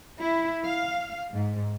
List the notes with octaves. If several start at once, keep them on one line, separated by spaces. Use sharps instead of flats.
E4
F5
G#2